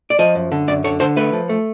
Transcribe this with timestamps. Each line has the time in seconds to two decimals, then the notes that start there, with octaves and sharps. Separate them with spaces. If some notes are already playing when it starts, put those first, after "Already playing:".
0.10 D5
0.19 F3 D#5
0.35 F#2
0.52 D3
0.68 F#2 D5
0.84 D3 C#5
1.00 D3 C5
1.16 A3 B4
1.33 F3
1.49 A3